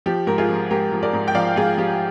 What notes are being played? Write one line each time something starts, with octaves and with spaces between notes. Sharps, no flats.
F3 G4
G#2 A#4
F4 G#4
F3
G#2 G4 A#4
F3
A#4 D5
G#2
G5
F3 D5 F5
G#2 F4 G#4
F3 G4